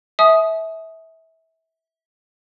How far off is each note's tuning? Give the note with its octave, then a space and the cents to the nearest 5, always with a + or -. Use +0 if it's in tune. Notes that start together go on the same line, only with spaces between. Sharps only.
E5 -25 G#5 +45 D#6 +0